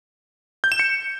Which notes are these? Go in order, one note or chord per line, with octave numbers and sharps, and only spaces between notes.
G6
E7
C#7